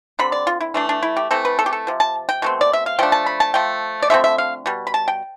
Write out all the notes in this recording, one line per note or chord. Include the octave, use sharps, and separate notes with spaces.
D3 G3 C4 B5
D5
F4
E4
E3 A3 D4
D4
E4
G4
E3 A3 C4 A4
B4
A4
G4
A4
C3 F3
A5
G5
B2 A3 C4
D5
E5
F5
F3 A3 D4 G5
A5
B5
A5
F3 A3 G5
D5
D3 F3 A3 C4 E5
E5
F5
B2 G3
B5
A5
G5